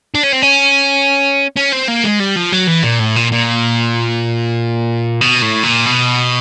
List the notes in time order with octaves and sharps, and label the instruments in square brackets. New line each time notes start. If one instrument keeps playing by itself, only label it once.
[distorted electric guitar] D4
C#4
C4
C#4
C#4
C4
A#3
G#3
G3
F3
F#3
E3
A#2
A2
A#2
A#2
B2
A2
A#2
B2